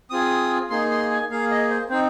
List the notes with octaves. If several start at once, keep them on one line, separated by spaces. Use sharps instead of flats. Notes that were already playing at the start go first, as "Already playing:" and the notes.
C4 F4 G#4 D#6
A#3 D#4 G#4 C6
C6
G#5
A#3 G#4 F5
D#5
C5
C4 D#4 C5